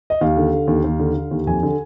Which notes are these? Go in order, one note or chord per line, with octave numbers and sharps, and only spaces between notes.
D#5
D#2 F5
D3
D3
D#2
D#2
D3
D3
D#2
F2 G#5
D3